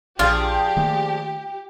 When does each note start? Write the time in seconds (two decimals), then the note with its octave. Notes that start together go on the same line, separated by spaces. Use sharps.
0.19 A#1 F3 F4 G4 G#4 D5
0.77 D#3 A3 A#3